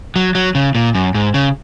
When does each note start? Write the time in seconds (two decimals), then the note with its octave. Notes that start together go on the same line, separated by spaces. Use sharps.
0.16 F#3
0.35 F#3
0.55 C#3
0.75 A#2
0.95 F#2
1.14 G#2
1.34 C#3